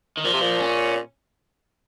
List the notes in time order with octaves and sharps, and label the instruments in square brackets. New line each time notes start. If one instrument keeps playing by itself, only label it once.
[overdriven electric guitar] D#3
[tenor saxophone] A#2 [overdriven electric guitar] F3
[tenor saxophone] C3
A#2
[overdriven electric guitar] C#4